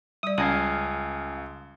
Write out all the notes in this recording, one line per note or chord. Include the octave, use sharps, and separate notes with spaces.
G3 D5 D#6
C#2 C#4 F5 G#5 A5 D#6